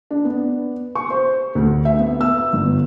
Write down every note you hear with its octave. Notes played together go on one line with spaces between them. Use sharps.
D4
B3
C#6
C5
D2
E5
B3
E6
G1